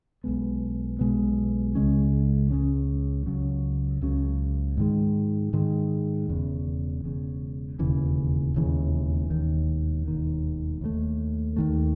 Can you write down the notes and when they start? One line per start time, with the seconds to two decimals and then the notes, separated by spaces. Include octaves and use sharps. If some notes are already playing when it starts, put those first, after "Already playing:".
0.24 B1 B2 G#3 B3
0.99 B1 B2 G#3 B3
1.75 C#2 C#3 G#3 C#4
2.50 C#2 C#3 G#3 C#4
3.26 C#2 C#3 F#3 C#4
4.01 C#2 C#3 F#3 C#4
4.77 G#2 D#3 G#3
5.53 G#2 D#3 G#3
6.28 E1 E2 C#3
7.04 E1 E2 C#3
7.79 E1 D#2 C#3 E3
8.54 E1 D#2 C#3 E3
9.30 E1 D#2 D#3
10.06 E1 D#2 D#3
10.81 D#2 D#3 A3
11.56 D#2 D#3 A3